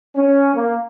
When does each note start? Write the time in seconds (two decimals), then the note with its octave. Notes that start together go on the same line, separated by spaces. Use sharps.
0.15 C#4
0.54 A#3